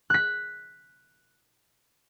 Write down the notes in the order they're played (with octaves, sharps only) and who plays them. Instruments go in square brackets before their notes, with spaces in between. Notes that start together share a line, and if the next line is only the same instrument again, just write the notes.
[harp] F#6 B6